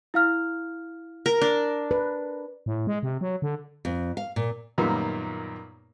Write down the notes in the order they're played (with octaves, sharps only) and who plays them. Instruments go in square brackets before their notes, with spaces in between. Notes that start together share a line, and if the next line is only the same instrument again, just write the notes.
[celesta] E4 F5 F6
[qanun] A#4
D4
[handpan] B4
[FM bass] A2
G#3
C3
F#3
D3
[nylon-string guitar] F2
F5
A#2
[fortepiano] F#2 A#2 D#3 G3 A#3 B3